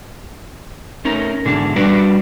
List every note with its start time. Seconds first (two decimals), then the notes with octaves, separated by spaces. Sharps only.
1.05 A3 C#4 D#4 A#4
1.45 G#2 B2 D3 E3 D4 G#4
1.76 G3 D4 F#4 B4 D5